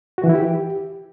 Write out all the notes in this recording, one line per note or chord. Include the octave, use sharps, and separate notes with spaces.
F#4
E3
E4
G4